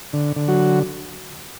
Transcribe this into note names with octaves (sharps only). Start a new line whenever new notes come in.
D3
D3
F#3 F#4